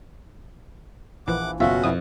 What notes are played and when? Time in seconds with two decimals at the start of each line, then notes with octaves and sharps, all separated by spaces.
1.27 A#1 E3 F3 F#5 D6
1.60 F#1 B2 C#4 F4 F#4 E5
1.84 F2 B2 E4 D#6